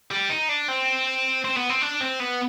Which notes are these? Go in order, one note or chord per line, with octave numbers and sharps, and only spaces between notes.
G3
D#4
D4
C4
C4
B3
C4
D4
C4
B3